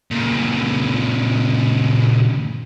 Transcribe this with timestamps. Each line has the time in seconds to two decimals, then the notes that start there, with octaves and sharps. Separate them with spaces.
0.11 A#2 C#3